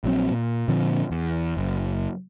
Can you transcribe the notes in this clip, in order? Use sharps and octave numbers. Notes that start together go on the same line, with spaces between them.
A#1 F#3 C4
A#2
A#2 D3 F3 C4
E2
F#1